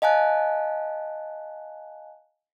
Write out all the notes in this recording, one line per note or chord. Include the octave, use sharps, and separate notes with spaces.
D#5 F5 G#5 A5 F#6